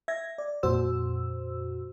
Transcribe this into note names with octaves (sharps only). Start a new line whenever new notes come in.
E5 G#6 A#6
D5
F2 A#2 F#4 C5 E6